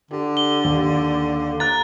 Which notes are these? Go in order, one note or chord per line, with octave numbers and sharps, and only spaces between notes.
D3 G4
G7
D#2
A#5 F#6 A6